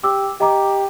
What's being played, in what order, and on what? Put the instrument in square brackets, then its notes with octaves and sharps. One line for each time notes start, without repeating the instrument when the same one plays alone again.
[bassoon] G4 [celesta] D6 E6
[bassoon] G4 [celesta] D#5 A#5 D6